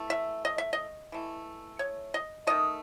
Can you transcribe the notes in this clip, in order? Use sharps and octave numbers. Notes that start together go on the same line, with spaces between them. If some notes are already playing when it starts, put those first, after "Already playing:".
Already playing: E3 A3
E5
D#5
E5
D#5
E3 A3
C#5
D#5
D#3 A3 D#5